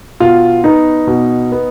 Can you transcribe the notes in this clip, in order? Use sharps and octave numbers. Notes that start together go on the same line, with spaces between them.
B2 F4
B3 D#4
B2
B3